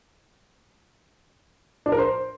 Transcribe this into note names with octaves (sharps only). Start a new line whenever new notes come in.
D4
A#4
C5